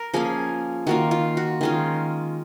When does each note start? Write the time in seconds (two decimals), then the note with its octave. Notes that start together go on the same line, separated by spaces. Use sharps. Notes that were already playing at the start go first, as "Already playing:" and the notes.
Already playing: A#4
0.14 F3 A#3 C#4 G#4
0.87 D#3 A#3 F4 F#4
1.11 F4
1.37 F#4
1.61 D#3 G#3 C#4 F4